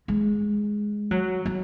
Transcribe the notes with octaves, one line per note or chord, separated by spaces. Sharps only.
G#3
F#3
F#3